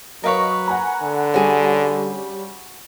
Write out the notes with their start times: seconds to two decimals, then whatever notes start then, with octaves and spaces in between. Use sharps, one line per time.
0.24 F#3 A#4 B4 C#5 D#5 F5 C#6
0.68 F#5 G#5 A#5
1.02 D3
1.34 G3 C#4 F#4 G#4